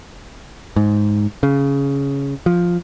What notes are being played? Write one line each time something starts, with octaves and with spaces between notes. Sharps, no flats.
G#2
C#3
F3